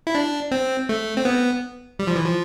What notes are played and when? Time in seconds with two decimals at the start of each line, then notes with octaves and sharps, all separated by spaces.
0.07 E4
0.15 D4
0.51 C4
0.89 A3
1.17 C4
1.25 B3
1.99 G3
2.07 F3
2.16 E3
2.24 F3